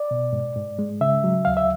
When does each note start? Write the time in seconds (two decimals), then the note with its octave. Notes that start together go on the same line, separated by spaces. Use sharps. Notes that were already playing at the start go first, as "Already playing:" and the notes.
Already playing: D5
0.11 B2
0.33 G#2
0.56 G#2
0.79 G#3
1.01 C#3 E5
1.24 F#3
1.45 D2 F5
1.57 E5